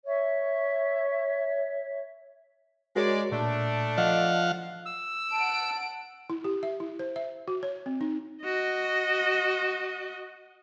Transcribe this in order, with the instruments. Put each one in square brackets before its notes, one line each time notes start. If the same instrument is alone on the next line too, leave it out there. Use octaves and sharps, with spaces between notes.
[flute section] C#5 E5
[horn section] G#3 D5 [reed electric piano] F#4 A#4 C#5
[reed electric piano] A#2 [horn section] A3 D4
[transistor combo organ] F3 F5 F#5 [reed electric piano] D#5
[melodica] E6
[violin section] F#5 D7 [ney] A5
[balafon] E4
G4
E5
E4
C5
E5
F#4
C#5
C4
D#4
[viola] F#4 D#5